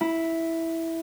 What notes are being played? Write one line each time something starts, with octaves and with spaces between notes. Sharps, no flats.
E4